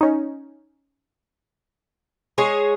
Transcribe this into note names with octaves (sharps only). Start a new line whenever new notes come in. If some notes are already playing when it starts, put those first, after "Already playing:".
C#4 D#4
G#3 G#4 C#5